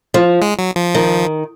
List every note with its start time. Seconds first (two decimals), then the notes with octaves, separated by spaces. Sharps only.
0.14 F3
0.42 G#3
0.59 F#3
0.76 F3
0.95 D#3